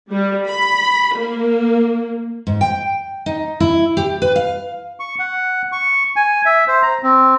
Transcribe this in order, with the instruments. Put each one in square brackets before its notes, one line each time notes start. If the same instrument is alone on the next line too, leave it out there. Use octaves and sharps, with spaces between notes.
[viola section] G3
B5
A#3
[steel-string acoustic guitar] G#2
G5
D#4
E4
G4
B4
F5
[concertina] C#6
F#5
C#6
G#5
E5
C5
A#5
C4